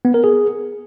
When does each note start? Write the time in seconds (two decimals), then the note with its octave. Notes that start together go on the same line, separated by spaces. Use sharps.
0.05 B3
0.14 A#4
0.24 G#4